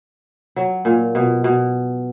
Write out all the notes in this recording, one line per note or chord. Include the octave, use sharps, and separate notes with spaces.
F#3
A#2
B2
B2